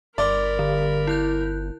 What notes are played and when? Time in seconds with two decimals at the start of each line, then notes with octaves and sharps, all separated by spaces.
0.18 G1 A#4 D5 B5 C6 D6 F6
0.59 D3
1.07 E4 F#6 G6